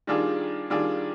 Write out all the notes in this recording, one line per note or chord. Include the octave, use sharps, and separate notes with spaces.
D#3 G3 D4 F4 G#4
D#3 G3 D4 F4 G#4